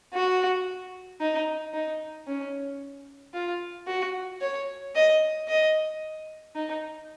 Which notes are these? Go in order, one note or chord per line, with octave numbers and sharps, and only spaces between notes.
F#4
D#4
D#4
C#4
F4
F#4
C#5
D#5
D#5
D#4